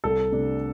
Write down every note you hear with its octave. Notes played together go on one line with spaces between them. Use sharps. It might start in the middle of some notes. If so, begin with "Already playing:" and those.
C2 A4
C3 A3 D4